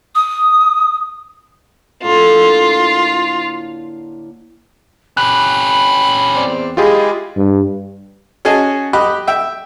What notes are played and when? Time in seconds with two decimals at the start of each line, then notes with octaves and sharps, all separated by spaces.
0.15 D#6
2.03 A2 D3 A#3 F4
5.17 C#4 G4 B5 F#6
6.35 E2 C4 D5
6.77 G#3 E4 F4 G4 G#4 D#5
7.37 G2
8.45 C#4 F#4 G#4 D#5 G#5 A5
8.93 G4 D#5 B5 D6 F#6
9.27 E5 G5